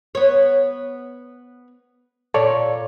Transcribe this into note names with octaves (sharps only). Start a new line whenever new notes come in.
B3 C#5
A#2 A4 C#5 D5